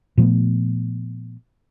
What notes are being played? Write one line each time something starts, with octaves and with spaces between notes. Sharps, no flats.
A#2 F3 A3 B3